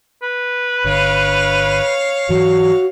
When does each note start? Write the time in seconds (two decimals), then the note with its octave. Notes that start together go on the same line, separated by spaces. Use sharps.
0.23 B4
0.84 G1 D3 C#5 F5
2.29 G#2 E3 F#3 F#4